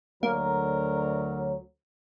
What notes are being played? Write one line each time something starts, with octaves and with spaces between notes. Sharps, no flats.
D2 F#3 A#3 A#4